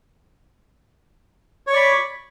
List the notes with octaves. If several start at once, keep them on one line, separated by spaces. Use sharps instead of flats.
C#5 D5 B5 C#6